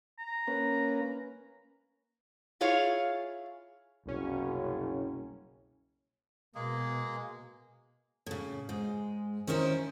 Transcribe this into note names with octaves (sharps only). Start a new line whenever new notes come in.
A#5
A#3 C#4 B4
E4 F4 G#4 C#5 F5
F#1 C2 B2 C#4
B2 G#3 A#3 G#4
A2 C#3
G#2 G#3
D#3 C#4 D#4 E4 C5